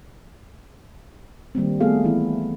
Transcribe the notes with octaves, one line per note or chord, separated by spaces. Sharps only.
D#3 G3 A#3 C4
A3 B3 G#4 A4 F5
E3 B3 E4